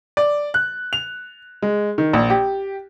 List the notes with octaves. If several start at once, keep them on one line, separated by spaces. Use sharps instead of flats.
D5
F#6
F7
G#3
D#3
A#1
G4